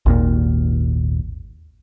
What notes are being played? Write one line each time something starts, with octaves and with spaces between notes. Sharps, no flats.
G#1 D#2 A#2